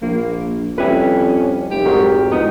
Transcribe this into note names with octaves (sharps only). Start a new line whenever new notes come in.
A#1 A#3
F2 G3 C#4 E4 B4
F1 G4
G#2 F#3 A#4
E1 B3 D#4